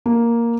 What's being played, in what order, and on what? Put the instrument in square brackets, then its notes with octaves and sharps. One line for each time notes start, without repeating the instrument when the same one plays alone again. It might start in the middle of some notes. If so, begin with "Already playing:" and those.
[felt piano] A#3